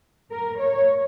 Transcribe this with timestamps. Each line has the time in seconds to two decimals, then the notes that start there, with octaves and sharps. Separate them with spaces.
0.31 A#4
0.59 C#5